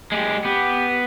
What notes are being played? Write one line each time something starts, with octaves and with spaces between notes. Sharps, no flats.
G#3 G4
B3 G4